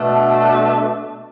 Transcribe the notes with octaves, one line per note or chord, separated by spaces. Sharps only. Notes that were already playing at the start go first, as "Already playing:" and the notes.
Already playing: B2 A3 D4